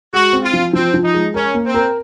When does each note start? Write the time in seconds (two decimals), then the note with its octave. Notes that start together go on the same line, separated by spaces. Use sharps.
0.13 G#3 F#4
0.33 C4
0.43 F4
0.53 F3
0.73 F3 C4
0.94 F3
1.03 D#4
1.14 G#3
1.34 C#4 A#4
1.54 A#3
1.65 C4
1.74 A#4